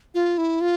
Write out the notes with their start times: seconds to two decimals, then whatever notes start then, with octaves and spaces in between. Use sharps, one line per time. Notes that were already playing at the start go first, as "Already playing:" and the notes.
0.14 F4
0.38 E4
0.61 F4